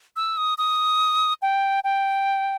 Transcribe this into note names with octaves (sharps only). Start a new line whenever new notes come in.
E6
D#6
D#6
G5
G5